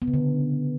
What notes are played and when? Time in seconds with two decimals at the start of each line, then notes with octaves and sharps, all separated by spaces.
0.02 B3
0.08 C#3
0.14 D3